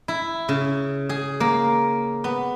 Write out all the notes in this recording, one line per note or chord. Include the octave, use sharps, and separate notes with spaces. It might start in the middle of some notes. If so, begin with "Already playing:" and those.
E4
C#3
G#4
A#3
B3